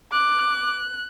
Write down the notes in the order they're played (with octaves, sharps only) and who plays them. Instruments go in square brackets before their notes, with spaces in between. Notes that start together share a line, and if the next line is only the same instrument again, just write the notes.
[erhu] D6 [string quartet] F#6